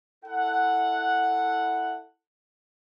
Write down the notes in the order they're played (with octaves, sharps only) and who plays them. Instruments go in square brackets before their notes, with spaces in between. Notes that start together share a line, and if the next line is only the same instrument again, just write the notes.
[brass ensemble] E4 A4 F#5